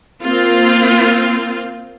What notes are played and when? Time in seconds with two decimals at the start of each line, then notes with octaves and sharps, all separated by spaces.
0.23 A#3 C4 F4